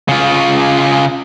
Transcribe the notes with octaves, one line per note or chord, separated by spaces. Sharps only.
C#3 F4